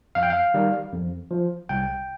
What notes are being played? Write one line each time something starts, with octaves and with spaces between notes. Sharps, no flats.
F2 F5
G5
F5
D#3 G3
F2
F3
C2 G5